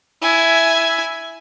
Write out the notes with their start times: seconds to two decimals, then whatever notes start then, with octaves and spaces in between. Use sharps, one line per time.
0.22 E4 G#5